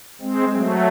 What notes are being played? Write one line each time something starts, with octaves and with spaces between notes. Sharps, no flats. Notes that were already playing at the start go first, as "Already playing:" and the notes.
G#3 C4
F#3 A3